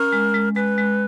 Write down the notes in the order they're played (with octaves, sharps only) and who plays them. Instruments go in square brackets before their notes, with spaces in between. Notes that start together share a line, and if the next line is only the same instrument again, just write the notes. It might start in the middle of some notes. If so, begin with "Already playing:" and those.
Already playing: [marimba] C#4 [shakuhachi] A#4
[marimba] G#3
G#3
[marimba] G#3 [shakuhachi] B4
[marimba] G#3